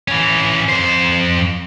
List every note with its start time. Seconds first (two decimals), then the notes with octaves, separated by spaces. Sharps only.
0.08 E3 C#4
0.69 F2 C5